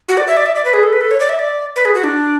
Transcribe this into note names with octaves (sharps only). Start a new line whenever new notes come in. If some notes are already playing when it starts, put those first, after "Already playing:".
F#4
D5
E5
D5
E5
D5
B4
G#4
A4
B4
A4
C#5
D5
E5
D5
B4
G#4
F#4
D4